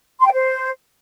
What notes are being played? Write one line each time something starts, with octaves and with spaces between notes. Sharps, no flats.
C6
G5
C5